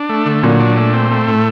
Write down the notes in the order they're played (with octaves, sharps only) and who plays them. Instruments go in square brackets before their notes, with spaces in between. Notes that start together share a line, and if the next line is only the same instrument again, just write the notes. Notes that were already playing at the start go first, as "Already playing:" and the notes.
Already playing: [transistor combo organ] D4
A3
D3
[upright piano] A#2 [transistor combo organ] F#3
[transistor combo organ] D4
A3
C4
A3
A2